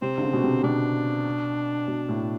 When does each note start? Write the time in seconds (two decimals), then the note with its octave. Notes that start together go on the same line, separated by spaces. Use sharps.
0.02 C3 C4
0.18 D3
0.23 C#3
0.33 B2
0.44 C3
0.63 B2 D4
1.88 B2
2.09 A2